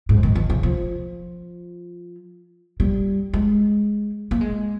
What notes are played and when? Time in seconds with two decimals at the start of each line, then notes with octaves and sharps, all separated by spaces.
0.09 G#2
0.23 D#3
0.35 D#3
0.50 C#3
0.63 F3
2.80 G3
3.33 G#3
4.31 A#3
4.41 G#3